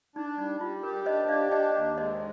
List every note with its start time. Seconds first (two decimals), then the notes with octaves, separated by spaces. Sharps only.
0.16 D4 D#4
0.38 G3 D#4
0.61 G3 F4
0.83 G4 A#4
1.06 D4 C5 D#5
1.28 G4 D5 F5
1.51 D4 D#5 G5
1.74 D#2
1.97 G#3 C5 D#5